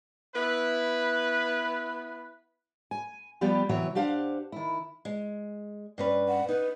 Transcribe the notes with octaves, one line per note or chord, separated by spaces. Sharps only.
B3 E4 B4
G#5
F3 G3 B3 G4
C3 E3 F#3 B3 C#5 E5
D4 G4 C5 F5 F#5
D#3 E4
G#3
G2 C#4 B4
F#5
D#4 B4